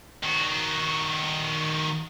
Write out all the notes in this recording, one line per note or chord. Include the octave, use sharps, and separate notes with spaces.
D#3 F#4